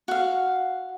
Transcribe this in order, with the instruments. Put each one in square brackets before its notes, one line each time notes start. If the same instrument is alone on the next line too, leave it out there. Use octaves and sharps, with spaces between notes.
[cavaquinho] F#4 F5